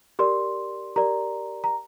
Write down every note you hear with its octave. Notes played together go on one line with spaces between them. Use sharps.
G4 A#4 D5 C6
G4 A#4 D5 A#5
A#5